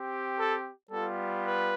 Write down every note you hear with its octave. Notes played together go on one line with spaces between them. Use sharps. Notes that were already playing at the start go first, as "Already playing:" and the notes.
Already playing: C4 G4
A4
G3 B3 F4 A4
B4